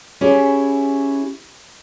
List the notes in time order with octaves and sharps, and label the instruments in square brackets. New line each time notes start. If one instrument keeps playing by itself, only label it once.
[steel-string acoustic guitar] C#4 E4 G4 G#4